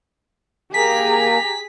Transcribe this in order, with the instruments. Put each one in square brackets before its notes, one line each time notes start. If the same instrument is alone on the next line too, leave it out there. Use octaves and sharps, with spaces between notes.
[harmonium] A#3 [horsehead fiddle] G4 A#5 [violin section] G#4 [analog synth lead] B6